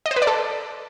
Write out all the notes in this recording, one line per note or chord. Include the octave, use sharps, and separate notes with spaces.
D#5
C5
B4
D5
A4